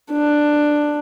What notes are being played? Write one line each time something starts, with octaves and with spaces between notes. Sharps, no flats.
D4